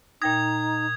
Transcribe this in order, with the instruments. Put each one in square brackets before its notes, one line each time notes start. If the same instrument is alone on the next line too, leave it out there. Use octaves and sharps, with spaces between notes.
[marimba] A#2 G5 A#6 [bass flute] D#4 [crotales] D#6 G#6